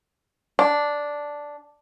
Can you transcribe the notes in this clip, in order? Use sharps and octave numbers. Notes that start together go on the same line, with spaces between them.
D4